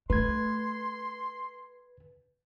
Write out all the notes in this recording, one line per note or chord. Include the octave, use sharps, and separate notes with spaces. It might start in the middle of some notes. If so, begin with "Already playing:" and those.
A3 B4 C6 G#6